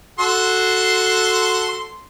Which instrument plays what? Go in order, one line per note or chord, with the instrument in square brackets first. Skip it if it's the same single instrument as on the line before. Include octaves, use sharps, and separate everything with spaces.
[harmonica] F#4 A4 C6